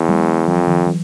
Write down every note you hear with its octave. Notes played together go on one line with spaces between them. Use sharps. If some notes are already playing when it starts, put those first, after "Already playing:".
Already playing: E2
F#3 G#3
F2 E3 F#3
D#3 F3
E3 F#3